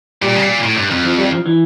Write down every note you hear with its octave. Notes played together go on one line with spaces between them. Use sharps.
A#2 G3
C#3
A#2
A2
G2
F2
F3
G3
F3
E3